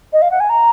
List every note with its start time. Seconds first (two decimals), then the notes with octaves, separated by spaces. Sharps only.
0.13 D#5
0.22 F5
0.31 F#5
0.40 G#5
0.50 A#5